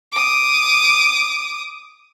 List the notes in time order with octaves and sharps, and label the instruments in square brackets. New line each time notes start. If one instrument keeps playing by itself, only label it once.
[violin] D6 D#6